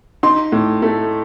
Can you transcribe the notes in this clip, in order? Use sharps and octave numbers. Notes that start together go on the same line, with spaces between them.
D#4 C6
A2
A3